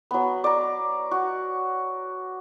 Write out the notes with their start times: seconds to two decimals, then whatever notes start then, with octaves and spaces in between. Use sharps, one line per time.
0.11 F#3 B3
0.44 D5 A#5
1.11 F#4